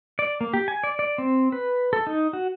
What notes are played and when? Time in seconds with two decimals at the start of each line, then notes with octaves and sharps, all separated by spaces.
0.19 D5
0.41 A#3
0.54 G4
0.68 G#5
0.84 D5
0.99 D5
1.18 C4
1.52 B4
1.93 A4
2.07 D#4
2.33 F#4